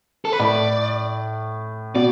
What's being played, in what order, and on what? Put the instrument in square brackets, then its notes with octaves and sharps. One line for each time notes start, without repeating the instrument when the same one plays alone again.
[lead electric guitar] A4
B4
[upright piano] A2 [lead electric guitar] D5
[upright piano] B2 [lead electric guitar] D5